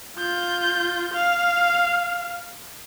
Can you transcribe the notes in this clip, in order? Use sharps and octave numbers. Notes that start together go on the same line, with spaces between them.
F4 G6
F5